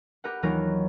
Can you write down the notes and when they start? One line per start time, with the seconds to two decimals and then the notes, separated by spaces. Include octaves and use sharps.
0.24 G4 A#4 B4 F#5
0.42 D#2 E3 F#3 D#4 F4 A#4